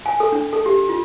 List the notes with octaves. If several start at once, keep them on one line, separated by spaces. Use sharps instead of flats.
G#5
A4
D4
A4
G4
F4